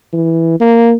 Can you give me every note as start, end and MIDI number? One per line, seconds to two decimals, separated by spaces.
0.13 0.59 52
0.60 0.94 58